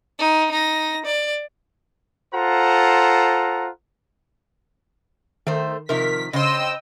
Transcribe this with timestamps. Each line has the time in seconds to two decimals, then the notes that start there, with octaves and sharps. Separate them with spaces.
0.19 D#4
0.51 D#4 A#6
1.05 D5
2.34 F4 A4 C5 F#5 A#5
5.47 D#3 A3 C5
5.89 C3 D#3 F3 A#4 B6
6.33 C#3 C5 D#5 G5 C6 E6 A#6